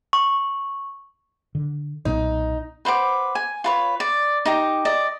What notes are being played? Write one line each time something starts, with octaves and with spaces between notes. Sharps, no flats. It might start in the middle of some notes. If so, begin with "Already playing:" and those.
C#6
D3
B1 A#2 B3 D#4
B4 C5 F#5 D6
G#5
F4 B4 C#5
D5
D#4 G4 A#5
D5 D#5